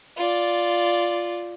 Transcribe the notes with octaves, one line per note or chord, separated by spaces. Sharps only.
F4 D5